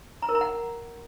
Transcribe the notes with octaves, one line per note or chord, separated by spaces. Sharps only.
A#5
A#4
A#5
F#5